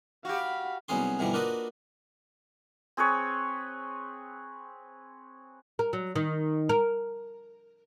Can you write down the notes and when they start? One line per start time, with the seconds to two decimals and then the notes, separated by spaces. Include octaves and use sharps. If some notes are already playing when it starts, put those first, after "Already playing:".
0.25 F#4 G4 F5 B5
0.88 C2 F#3 B3 C#4 G#4 C6
1.19 G2 B2 D3 E3 F3 G3
1.33 A#3 D4 F4 F#4 B4 D#5
2.97 C4 G#4 B4 C#5
5.79 A#4
5.93 F#3
6.15 D#3
6.69 A#4